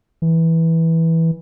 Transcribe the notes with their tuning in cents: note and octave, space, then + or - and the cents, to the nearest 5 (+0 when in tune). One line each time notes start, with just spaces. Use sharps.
E3 -10